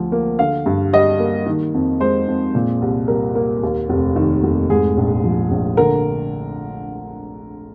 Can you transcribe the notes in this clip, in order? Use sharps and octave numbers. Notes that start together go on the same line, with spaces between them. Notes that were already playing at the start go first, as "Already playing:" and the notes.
Already playing: D2 F3
A#3
D3 F5
G2
G3 D#5
A#3
D#3
F2
G#3 C5
F2
A#2
C2
G3 A#4
A#3
D#2
F1
D#3
F1
G#2 G#4
A#1
F3
A#1
D3 A#4